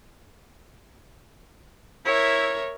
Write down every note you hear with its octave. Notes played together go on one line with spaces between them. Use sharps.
E4 A#4 C#5 E5